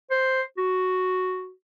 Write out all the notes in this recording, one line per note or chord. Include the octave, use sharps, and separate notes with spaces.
C5
F#4